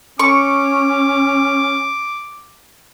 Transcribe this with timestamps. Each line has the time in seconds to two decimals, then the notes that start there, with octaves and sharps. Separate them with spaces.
0.19 C#4 C#6 D6